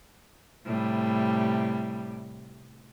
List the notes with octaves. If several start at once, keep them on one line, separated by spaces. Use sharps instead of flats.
A2 C3 G3